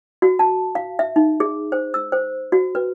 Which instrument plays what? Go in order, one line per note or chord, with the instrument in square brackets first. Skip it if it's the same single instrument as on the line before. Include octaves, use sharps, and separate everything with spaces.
[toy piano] F#4
A5
F5
E5
D#4
G#4
C5
E6
C5
F#4
B4